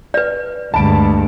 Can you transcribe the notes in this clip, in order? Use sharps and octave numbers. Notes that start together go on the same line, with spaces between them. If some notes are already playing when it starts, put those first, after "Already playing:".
B4 D5
D2 G2 G#3 A5 B5 D7